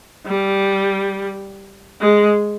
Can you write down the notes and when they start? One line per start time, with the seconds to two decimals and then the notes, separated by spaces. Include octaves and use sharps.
0.26 G3
2.01 G#3